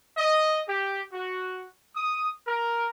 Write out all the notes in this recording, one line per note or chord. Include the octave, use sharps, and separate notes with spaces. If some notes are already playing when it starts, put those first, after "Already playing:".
D#5
G4
F#4
D#6
A#4